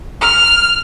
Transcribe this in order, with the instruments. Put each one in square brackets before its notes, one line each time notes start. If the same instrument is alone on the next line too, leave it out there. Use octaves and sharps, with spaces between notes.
[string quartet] F6